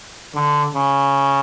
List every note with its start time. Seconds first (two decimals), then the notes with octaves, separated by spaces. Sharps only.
0.34 D3
0.74 C#3